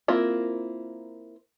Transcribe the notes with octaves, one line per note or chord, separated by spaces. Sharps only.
A#3 C4 E4 F4 A#4